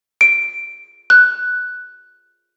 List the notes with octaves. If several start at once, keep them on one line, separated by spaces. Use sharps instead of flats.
D7
F#6